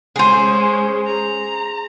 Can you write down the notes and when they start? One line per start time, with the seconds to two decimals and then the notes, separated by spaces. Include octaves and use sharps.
0.16 G#3 C#4 G#4 C5
1.06 A#5